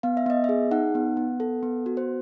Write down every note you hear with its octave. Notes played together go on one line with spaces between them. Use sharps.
B3 F5
E5
B3 D#5
G#4 E5
D#4 F#5
B3
B3
A4
B3
F#4
C5